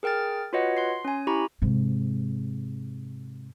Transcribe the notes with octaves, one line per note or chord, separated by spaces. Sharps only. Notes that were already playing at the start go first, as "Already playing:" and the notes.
G#4 A#4 G5 F6 A6
F4 F#4 B4 C#5 D#5 F#5
C6 C7
C#4 G#5
E4 G4 A#5 B5 C#6
G#2 C3